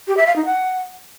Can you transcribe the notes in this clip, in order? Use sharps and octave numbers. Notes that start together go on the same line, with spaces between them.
G4
E5
F5
D#4
F#5